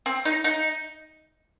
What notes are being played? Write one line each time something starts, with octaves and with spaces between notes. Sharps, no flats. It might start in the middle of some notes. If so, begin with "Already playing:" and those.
C4
D#4
D#4